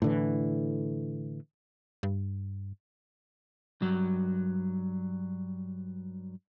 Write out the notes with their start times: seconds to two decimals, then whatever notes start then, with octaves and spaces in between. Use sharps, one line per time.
0.02 A2 D3 E3
2.03 G2
3.82 G2 F#3